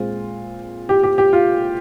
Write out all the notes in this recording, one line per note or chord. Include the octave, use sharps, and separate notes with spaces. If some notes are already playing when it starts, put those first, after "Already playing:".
Already playing: A#2 G#3 C4 F4
G4
G4
G4
F4